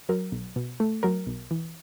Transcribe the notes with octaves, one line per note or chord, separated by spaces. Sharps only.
F#3 A#4
B1
B2
A3
F#3 A#4
B1
E3